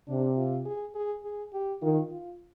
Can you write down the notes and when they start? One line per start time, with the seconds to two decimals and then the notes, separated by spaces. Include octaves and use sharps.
0.08 C3 D4
0.37 F4
0.65 G#4
0.95 G#4
1.24 G#4
1.53 G4
1.82 D#3 F4
2.10 F4